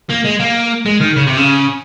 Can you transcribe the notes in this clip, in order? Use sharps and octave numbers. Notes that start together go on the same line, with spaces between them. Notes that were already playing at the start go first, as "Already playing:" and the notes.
A#3
G#3
A#3
G#3
D#3
C#3
C3
C#3